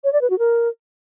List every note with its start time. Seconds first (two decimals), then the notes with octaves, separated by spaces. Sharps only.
0.04 C#5
0.13 D5
0.21 B4
0.30 F#4
0.39 A#4